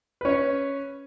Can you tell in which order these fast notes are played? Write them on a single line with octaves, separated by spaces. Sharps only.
B4 C#4 C#5